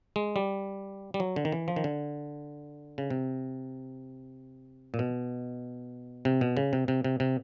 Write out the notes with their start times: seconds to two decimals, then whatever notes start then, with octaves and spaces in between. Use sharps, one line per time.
0.16 G#3
0.36 G3
1.14 G3
1.20 F#3
1.36 D3
1.45 D#3
1.52 E3
1.68 F3
1.76 D#3
1.84 D3
2.98 C#3
3.10 C3
4.94 A#2
4.99 B2
6.25 C3
6.41 B2
6.57 C#3
6.73 C3
6.88 C3
7.04 C3
7.20 C3